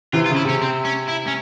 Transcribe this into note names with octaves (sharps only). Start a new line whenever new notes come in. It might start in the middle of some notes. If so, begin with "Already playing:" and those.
C3 E3 F4
F4
C#3
E4
C3 C#4
C4
C#4
E4
C#4